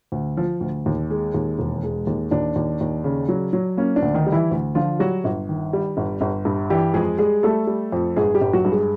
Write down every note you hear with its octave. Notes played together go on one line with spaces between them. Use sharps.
D2
F3
D2
D#2
G#3
D#2
E1
G#3
D#2
D#2 D4
D#2
D#2
C#3
F#3
F#3
A#3 C#4
D4
D2
D#3 D#4
G3
E3 E4
D2
D3 F3 F4
F#3 G3 F#4
G1
D#3
G3
G1
G1
G2
E3 G3 G4
F2 G#3 G#4
G3 G#3 G#4
G3 A3 A4
G3
F2
G1 G#3 G#4
G3 G4
G1
F#3 F#4
G2
G#3 G#4